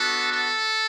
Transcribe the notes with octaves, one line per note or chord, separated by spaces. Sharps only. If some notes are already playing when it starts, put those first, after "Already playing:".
Already playing: B3 D4 F#4 A4
A4